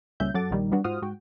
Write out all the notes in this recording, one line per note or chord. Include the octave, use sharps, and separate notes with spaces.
C#2 A#2 G3 C#4 E5 G6
F#2 F#3 A4 F#5 D6 A6
A#1 D#3 G3
F#3 G3 B3 D4 F#4
G#2 F4 F#4 C5 D#6 F6
G#2 F#4 G5